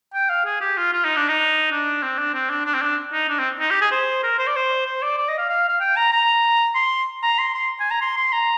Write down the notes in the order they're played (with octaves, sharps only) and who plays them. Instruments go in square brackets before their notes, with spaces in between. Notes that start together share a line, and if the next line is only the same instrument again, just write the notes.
[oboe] G5
F5
G#4
G4
F4
F4
D#4
D4
D#4
D4
C4
D4
C4
D4
D4
C4
D4
D#4
D4
C4
D#4
G4
G#4
C5
A#4
C5
D5
C5
C5
D5
D5
D#5
F5
F5
F5
G5
A#5
A#5
C6
A#5
C6
C6
G#5
A#5
C6
C6
A#5